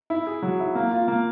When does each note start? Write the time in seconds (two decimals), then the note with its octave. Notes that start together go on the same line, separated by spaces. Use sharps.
0.10 E4
0.27 G#4
0.42 F#3
0.60 E4
0.75 A#3
0.91 F4
1.08 A#3